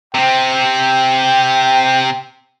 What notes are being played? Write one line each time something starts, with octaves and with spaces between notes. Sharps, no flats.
C3 C4 G5